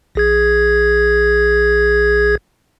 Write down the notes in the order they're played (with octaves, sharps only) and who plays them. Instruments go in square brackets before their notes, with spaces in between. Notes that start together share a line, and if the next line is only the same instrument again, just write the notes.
[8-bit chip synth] A#1 G#4 G#6